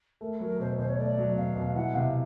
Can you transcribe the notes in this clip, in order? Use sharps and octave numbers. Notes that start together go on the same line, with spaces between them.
A3 A#4
F#3 A#4
B2 C5
B2 C5
C#5
A3 D5
F#3
B2 F5
B2
E3 F#5
C3 F5